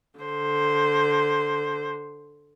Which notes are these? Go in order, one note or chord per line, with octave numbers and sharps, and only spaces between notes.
D3 C5